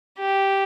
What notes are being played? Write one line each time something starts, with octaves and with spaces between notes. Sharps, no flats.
G4